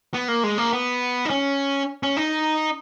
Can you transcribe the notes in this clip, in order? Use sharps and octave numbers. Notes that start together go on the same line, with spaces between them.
B3
A#3
G#3
A#3
B3
D#4
C#4
C#4
D#4